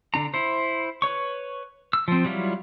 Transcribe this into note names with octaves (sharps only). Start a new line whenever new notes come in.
D3 D4 A#5
E4 C5
B4 C#5 C#6
E6
F3 C4
F#3 G3 E4 F4